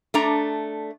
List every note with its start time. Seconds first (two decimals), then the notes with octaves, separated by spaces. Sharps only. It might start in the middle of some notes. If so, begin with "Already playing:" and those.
0.14 A3 D4 A#5